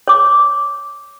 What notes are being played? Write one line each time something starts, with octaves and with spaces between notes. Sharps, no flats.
C#5 D6